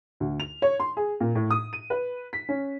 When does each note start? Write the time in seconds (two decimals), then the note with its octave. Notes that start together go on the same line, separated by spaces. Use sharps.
0.20 D2
0.40 F7
0.62 C#5
0.80 C6
0.97 G#4
1.21 A#2
1.35 A2
1.51 D#6
1.73 D#7
1.90 B4
2.33 B6
2.49 C#4